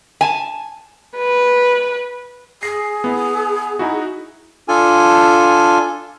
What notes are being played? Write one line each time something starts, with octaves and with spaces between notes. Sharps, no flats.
G#5 A5
B4
G#4 A#6 C7
B3 E4
D#4 E4 F#4
D4 F4 A4 G#5